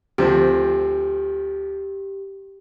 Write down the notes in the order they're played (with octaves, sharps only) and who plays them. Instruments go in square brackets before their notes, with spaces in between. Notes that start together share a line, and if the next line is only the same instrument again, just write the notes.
[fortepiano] D2 F3 C4 [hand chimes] G4